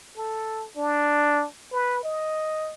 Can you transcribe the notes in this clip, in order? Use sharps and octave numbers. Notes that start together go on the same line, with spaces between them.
A4
D4
B4
D#5